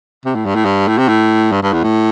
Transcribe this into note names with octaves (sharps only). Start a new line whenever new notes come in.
C3
A2
G2
A2
G2
A2
C3
A2
G2
G2
E2
A2